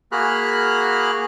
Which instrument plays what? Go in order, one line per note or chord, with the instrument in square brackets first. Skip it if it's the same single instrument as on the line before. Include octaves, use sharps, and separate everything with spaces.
[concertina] A#3 F#4 G#4 B5 F6 F#6